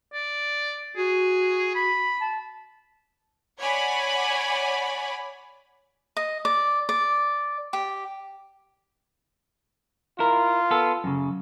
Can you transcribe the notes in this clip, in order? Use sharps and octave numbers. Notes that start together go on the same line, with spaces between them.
D5
F#4 G#4
B5
A5
C#5 D5 F#5 G#5 B5
D#5
D5
D5
G4
E4 F4 A#4
B3 A4
F#2 C#3